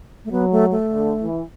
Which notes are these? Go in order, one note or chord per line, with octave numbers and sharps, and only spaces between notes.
A3
F#3 B3
A3
A3
D3
E3